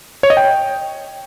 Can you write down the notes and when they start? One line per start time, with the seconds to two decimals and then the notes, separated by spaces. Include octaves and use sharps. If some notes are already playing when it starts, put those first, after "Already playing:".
0.23 C#5
0.30 D#5
0.37 G5